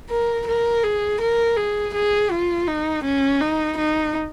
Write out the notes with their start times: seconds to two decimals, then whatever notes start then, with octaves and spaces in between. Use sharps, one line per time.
0.10 A#4
0.47 A#4
0.84 G#4
1.21 A#4
1.57 G#4
1.94 G#4
2.31 F4
2.67 D#4
3.04 C#4
3.41 D#4
3.77 D#4